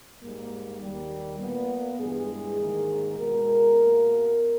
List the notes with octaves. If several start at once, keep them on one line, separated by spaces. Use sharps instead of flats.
G#2 G3 A#3
D#2 D#3 G3
A#2 A#3 B3
G2 E3 G#3 G#4
G#2 D#3 A#3
B2 G#3 A#4
B2 A#3